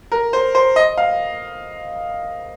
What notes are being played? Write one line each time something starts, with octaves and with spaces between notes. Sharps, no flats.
A#4
C5
C5
D#5
F5